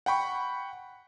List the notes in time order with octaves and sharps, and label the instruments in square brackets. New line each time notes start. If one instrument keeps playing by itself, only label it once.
[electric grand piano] F#5 G5 B5 C#6